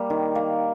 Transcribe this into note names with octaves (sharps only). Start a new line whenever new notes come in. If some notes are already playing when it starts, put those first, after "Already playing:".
Already playing: G3 A#3
D#3
A#3